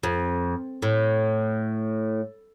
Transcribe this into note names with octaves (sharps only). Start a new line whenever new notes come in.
F2
A2